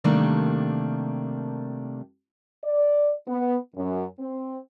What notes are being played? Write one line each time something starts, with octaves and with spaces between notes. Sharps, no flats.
C3 D#3 G3 A3 A#3 D4
D5
B3
F#2
C4